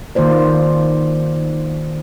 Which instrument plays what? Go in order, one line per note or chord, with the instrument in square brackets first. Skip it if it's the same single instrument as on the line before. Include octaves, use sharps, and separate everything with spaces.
[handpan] D#3 A#3 F4 C5 D5